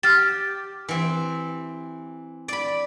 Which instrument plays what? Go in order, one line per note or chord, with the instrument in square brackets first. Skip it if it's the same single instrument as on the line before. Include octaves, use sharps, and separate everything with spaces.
[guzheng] G4 [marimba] F6 A6
[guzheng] E3 C4
D5 B5